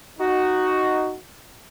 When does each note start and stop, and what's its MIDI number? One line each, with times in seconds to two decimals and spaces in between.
0.19 1.15 63
0.19 1.15 66